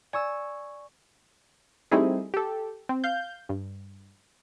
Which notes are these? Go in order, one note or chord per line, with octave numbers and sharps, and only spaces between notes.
D5 G#5 C#6 E6
G3 A3 C4 D#4 E4 G#4
G4 A4
C4
F5 G6
G2